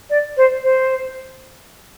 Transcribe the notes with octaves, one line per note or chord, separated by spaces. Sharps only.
D5
C5
C5